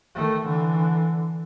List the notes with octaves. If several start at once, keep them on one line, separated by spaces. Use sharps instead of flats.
D#3 A3
D3 E3